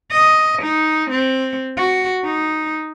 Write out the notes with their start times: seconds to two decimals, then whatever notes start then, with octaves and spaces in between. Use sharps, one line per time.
0.11 D#5
0.62 D#4
1.11 C4
1.77 F#4
2.24 D#4